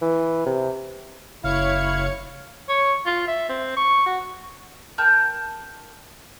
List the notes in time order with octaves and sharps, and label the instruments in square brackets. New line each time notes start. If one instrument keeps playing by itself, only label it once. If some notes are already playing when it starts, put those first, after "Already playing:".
[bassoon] E3
C3
[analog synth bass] F#1 [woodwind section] E4 [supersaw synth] C#5 G#6 C#7 [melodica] F5
[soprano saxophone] C#5
F4
E5
C4
C#6
F#4
[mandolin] A#4 G5 A5 G6